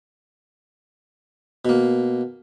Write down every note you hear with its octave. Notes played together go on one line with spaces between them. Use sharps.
B2 A#3